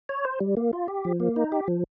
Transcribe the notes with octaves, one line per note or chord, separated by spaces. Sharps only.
C#5
C5
G3
A#3
F4
G4
F3
A#3
D#4
G4
F3